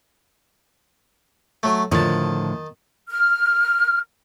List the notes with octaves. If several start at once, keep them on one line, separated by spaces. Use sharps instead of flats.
F#3 A3
A2 D3 D#3 F3 A5
F6